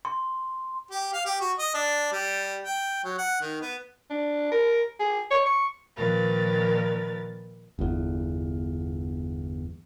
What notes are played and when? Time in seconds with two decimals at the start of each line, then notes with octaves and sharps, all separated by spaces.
0.05 C6
0.91 G4
1.13 F5
1.25 G4
1.40 F#4
1.59 D#5
1.75 D4
2.12 G3
2.62 G5
3.04 F#3
3.18 F#5
3.41 D#3
3.61 B3
4.10 D4
4.52 A#4
5.00 G#4
5.31 C#5
5.46 C#6
5.96 A#2 D#3 F3 A#4 B4 A6
7.79 G1 E2